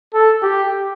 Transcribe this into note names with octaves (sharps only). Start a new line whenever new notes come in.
A4
G4